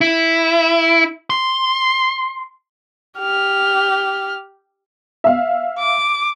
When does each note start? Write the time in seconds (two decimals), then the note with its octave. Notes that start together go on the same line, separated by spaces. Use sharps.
0.01 E4
1.30 C6
3.18 G4 F6
5.24 E5 F5
5.78 D6